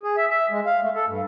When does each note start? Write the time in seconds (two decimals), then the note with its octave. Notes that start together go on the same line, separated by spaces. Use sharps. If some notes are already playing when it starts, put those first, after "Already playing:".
0.03 G#4
0.17 E5
0.30 E5
0.51 G#3
0.66 F5
0.81 A3
0.95 A4
1.07 G2